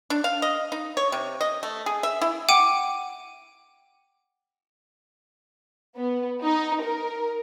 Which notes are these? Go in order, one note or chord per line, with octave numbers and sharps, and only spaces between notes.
D4
F5
D#5
D#4
C#5
C3
D#5
A3
G#4
E5
E4
F#5 G5 D6 D#7
B3
D#4
A#4